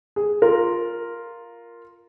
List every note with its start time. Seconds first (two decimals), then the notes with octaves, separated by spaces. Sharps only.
0.16 G#4
0.42 F4 A#4